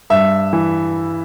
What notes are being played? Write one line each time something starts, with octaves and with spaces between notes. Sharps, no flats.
G2 E5
E3